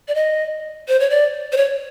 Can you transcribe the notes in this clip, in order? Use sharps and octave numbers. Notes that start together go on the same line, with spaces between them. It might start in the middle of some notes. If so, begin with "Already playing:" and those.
D5
D#5
C5
C#5
D5
C5
C#5